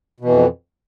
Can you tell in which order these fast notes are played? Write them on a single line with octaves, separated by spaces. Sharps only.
B2 E3 F2